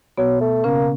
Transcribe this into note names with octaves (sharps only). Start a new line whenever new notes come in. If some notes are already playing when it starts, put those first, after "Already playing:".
B2 F#3 B3
A3
C#3 A#3 C#4